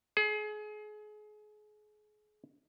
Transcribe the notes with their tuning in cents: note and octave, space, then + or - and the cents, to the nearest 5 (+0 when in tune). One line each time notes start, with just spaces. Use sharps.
G#4 +30